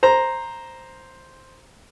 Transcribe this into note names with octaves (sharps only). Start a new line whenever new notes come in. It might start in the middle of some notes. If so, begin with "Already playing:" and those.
C5 A#5